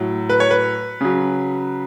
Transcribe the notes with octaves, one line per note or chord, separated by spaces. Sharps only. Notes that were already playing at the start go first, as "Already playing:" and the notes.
Already playing: A2 F#3
B4
C#5
B4
C#3 F#3